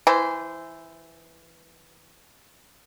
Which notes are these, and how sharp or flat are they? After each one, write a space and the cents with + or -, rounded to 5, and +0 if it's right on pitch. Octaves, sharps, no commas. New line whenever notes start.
E3 +0 C5 -20